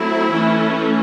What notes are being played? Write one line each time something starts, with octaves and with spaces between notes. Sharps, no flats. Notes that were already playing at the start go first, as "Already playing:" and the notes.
Already playing: F#3 A3 C4 E4
E3 A3 C#4